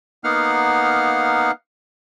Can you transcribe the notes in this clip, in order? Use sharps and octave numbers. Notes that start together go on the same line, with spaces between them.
A#3 B3 D#4 F5 F#5 F6